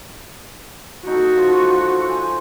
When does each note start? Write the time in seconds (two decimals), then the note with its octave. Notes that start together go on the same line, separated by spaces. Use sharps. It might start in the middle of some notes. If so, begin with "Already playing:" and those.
1.07 D#4 F#4 A4
1.38 F3
2.08 C5 G#5